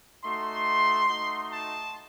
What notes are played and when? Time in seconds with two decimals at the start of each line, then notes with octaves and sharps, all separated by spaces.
0.24 A3 D#4 F#4 C6
1.09 A3 D#4 F#4
1.52 A5